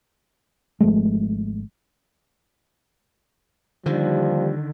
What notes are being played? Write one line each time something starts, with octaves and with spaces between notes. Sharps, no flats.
G#1 F3 G#3 A3
D#2 D3 D#3 F3 G3